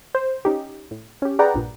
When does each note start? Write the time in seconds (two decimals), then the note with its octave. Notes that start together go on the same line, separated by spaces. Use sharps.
0.15 C5
0.45 C#4 D#4 G4
0.91 A2
1.22 C#4 G4
1.39 G#4 B4 D5 F#5 G5 A#5
1.54 A#1 G2 A#2